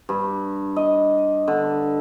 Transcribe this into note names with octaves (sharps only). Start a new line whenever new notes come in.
G2
D#5
D3